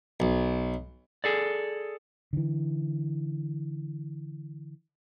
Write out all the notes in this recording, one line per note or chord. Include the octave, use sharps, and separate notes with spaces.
B1
G#4 A4 D5
D3 E3